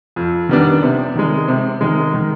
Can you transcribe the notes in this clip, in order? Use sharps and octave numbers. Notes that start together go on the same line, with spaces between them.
F2
D#3 G3 B3 D4
C3
D#3 G#3
C3
D#3 G#3
D#3